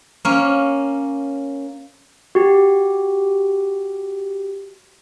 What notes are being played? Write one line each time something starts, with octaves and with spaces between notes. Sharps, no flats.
A#3 C#4
F#4 G4